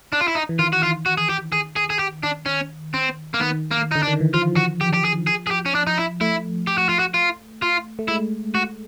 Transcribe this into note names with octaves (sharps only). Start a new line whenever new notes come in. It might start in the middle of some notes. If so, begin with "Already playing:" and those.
D4
F4
E4
D#4
E3
D#3 F4
F#4
F4
F#4
G#4
G4
G#4
G#4
G#4
G4
D4
C#4
C4
A#3
D#3 B3
A#3
D3 D#4
D4
D#3
E3
F3 F4
F#4
G4
G4
G#4
G#4
G#4
G4
C#4
D4
D#4
E4
A3 E4
G4
F#4
F4
F#4
F4
F4
A3
G#3 E4
F#4